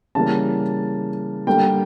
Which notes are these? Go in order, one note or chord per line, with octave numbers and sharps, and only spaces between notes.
C#3 E3 G3 A#3 A5
D3 G3 A#3 G5